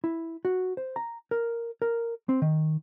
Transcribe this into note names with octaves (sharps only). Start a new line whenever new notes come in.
E4
F#4
C5
A#5
A#4
A#4
C4
D#3